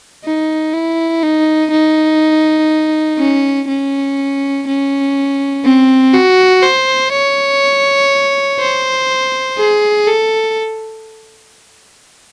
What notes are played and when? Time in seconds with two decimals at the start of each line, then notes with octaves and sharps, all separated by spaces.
0.25 D#4
0.73 E4
1.23 D#4
1.71 D#4
3.19 C#4
3.68 C#4
4.67 C#4
5.65 C4
6.13 F#4
6.63 C5
7.13 C#5
8.60 C5
9.58 G#4
10.08 A4